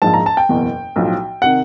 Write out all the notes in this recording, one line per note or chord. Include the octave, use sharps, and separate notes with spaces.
A#1 G#2 F3 A5
A#5
A5
G5
F#1 E2 B2
B1 A2 F3
C3 D#3 F#5